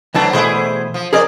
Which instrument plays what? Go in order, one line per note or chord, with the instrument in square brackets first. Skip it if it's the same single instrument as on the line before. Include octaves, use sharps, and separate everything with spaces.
[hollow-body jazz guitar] D2 E3 A5 [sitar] F#3 C4 D4
[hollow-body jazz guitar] B2 E3 A3 [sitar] E4 G#4 C5
[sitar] F3
[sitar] F2 C4 D5 [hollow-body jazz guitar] G#4 A#4 D#5